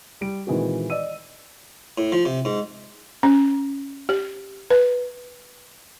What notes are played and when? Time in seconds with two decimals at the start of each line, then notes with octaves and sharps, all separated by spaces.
0.21 G3 D7
0.47 A#2 D#3 E3 G#3 C4 F#4
0.90 D5 D#5 E6 D#7
1.98 A2
2.12 F3
2.25 C3
2.45 G#2
3.23 C#4
4.09 G4
4.70 B4